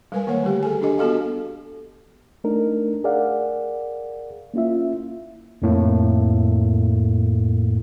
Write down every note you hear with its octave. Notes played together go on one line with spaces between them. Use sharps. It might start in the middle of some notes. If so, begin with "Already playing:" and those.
G3 G#3 A#4 B4 G#5
D#3 A#3 B4 C#5 F#5
D3 G3 A3 G4
G#4 A4 G#5
D4 G4 A4 D#5
B3 F#4 A4 D#5 F5
A3 D4 D#4 A#4
G#4 A#4 D5 F5 F#5
A#3 C#4 E4 F4 E5
F2 A2 A#3